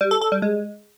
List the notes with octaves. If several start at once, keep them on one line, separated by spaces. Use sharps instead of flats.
G3
A4
A4
G3
G#3